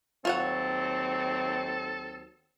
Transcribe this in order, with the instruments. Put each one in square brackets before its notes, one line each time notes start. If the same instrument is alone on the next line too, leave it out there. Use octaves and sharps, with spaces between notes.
[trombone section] D#2 F#3 C4 [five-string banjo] F4 C#5 F#5 [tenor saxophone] A4